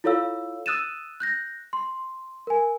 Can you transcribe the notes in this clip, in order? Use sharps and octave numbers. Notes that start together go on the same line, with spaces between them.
E4 F4 A4 C#5 F5 E6
D#6 E6 F#6 A6 D#7 E7
F#6 G6 A#6
C6
A#4 G#5